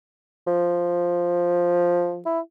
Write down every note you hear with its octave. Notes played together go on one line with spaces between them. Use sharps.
F3
E4